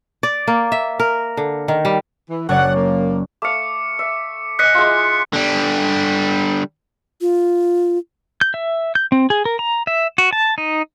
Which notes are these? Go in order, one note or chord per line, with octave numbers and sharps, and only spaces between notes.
D5
A#3
E5
A#4
D3
D#3
G3
E3
F#1 C#5 D5 F#5
A#3
A3 F5 D6 C#7
E5
D#5 G#5 F#6 B6 C#7
G#3 E4 F4
D3 G3
F4
G6
E5
G6
C4
G#4
A#4
A#5
E5
F#4
A5
D#4